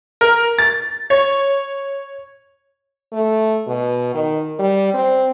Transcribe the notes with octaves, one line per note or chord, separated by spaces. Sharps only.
A#4
A6
C#5
A3
B2
D#3
G3
C4